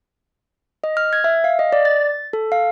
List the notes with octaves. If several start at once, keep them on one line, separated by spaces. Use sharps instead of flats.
D#5
F6
G#6
E5
F5
D#5
D5
A6
A4
F5